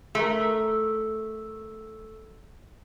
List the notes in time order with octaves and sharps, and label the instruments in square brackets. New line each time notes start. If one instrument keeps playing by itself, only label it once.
[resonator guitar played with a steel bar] A3 A#4